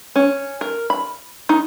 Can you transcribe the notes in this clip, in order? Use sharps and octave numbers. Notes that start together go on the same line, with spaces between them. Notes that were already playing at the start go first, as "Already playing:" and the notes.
C#4
A#4
B5
D#4